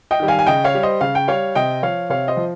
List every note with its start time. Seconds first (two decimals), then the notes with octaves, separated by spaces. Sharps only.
0.11 D#5 G5
0.20 D#3 G3
0.28 F5 G#5
0.39 G#5
0.46 C#3 D#5 G5
0.64 C#5 F5
0.75 G3
0.83 C5 D#5
1.01 C#3 F5
1.15 G5
1.28 G3 C#5 F5
1.55 C3 D#5 G5
1.83 F3 C#5 F5
2.10 C3 C#5 F5
2.28 C5 D#5
2.37 F3